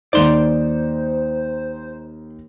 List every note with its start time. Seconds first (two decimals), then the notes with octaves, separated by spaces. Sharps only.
0.13 D#2 D#4 C5 D5 C6